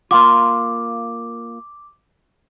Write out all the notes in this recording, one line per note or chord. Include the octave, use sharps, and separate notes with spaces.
A#3 F4 D6